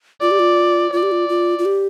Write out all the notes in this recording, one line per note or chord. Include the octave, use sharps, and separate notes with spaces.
F4 D5
G4
F4
F4 D5
G4
F4
F4
F4
G4